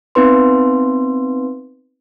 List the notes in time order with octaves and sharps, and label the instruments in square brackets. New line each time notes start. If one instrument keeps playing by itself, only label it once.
[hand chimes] B3 C4 D#4 B4 C6